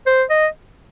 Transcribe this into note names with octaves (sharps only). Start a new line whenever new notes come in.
C5
D#5